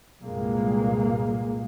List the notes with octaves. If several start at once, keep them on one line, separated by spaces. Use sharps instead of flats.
C2 G2 A#2 G#3 A#3